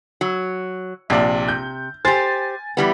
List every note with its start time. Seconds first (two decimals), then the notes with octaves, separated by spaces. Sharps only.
0.21 F#3
1.10 A#1 C3 D5
1.48 G6
2.05 G4 C5 G#5 A6
2.77 E3 G3 B3